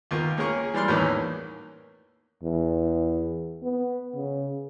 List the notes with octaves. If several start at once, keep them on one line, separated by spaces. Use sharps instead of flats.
D#2 B3 F4 A#4
A#3 C#4 G#4 A#4 C#6
E3 G3 D5 C6 F6
E2 A2 D#3 E3 A#3 C#4
E2
B3
C#3